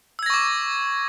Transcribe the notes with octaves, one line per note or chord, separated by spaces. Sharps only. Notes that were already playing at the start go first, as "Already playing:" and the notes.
C#6 D6 E6 G#6 A#6